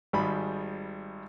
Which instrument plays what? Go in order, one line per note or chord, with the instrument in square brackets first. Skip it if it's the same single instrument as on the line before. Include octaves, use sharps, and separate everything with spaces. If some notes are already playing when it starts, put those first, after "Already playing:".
[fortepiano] G#1 G3 G#3 G#4 B5